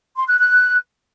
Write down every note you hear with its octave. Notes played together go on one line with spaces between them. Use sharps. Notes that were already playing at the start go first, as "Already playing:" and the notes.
C6
F#6
F#6